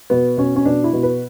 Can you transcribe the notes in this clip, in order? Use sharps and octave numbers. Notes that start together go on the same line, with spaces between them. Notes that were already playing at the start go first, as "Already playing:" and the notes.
B2 B3
B2 C#4
C#4
B2 D4
E4
B2
B4